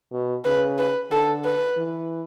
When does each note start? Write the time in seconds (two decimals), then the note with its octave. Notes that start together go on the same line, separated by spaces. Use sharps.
0.12 B2
0.45 C#3 B4
0.78 B4
1.11 D3 A4
1.44 B4
1.77 E3